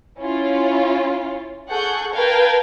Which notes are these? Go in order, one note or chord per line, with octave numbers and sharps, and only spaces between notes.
C#4 E4 F4
G#4 A4 F#5 C#6 F#6 G6
A#4 B4 F5 G5 A5 G#6